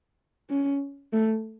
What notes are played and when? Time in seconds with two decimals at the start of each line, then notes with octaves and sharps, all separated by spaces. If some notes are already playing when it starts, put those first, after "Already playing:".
0.50 C#4
1.13 A3